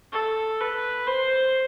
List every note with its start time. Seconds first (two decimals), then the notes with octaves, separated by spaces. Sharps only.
0.13 A4
0.61 B4
1.07 C5